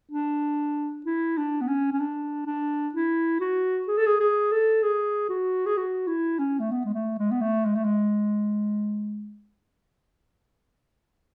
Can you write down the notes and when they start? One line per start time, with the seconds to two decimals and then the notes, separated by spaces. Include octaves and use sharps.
0.11 D4
1.06 E4
1.38 D4
1.61 B3
1.68 C#4
1.92 C#4
2.00 D4
2.46 D4
2.94 E4
3.41 F#4
3.88 G#4
3.97 A4
4.06 G#4
4.20 G#4
4.51 A4
4.83 G#4
5.29 F#4
5.66 G#4
5.77 F#4
6.07 E4
6.39 C#4
6.60 A3
6.71 B3
6.85 G#3
6.94 A3
7.18 G#3
7.31 B3
7.41 A3
7.65 G#3
7.75 A3
7.84 G#3